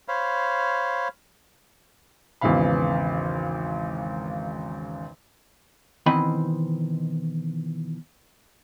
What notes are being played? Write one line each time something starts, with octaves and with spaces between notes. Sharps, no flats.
C5 C#5 F5 B5
G#1 E2 C#3 E3 F5 B5
B2 D#3 E3 C4 D#5 B5